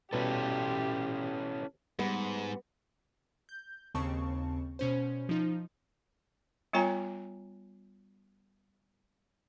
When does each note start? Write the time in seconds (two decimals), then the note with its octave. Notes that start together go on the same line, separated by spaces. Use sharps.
0.13 B2 G3 C#4 E4 G4 A4 B4
1.99 G#2 G3 B3
3.49 G6
3.95 D#2 C#3 C4 A5 C#6
4.79 B2 C#4 C5
5.29 F3 D#4
6.73 G3 B3 F4 C#5 G#5 A#5